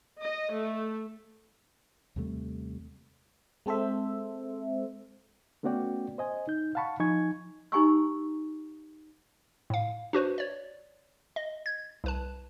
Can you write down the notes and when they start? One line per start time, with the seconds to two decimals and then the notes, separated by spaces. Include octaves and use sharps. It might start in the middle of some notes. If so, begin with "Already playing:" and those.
0.21 D#5
0.54 A3
2.16 D#2 C3 G3 A3
3.66 G#3 C4 A4 C5 E5
5.63 A3 B3 C#4 F#4 D5 G5
6.18 C5 D#5 G#5
6.47 D#4 G6
6.75 F5 F#5 A5 B5 C#6
7.00 F3 D#4 G#5 C#6 G#6
7.72 D#4 G4 G#5 A#5 C#6 E6
9.70 A2 F5
10.13 D4 F#4 B4 C5
10.38 C#5 D5
11.36 D#5
11.66 G#6
12.04 C2 B4 A5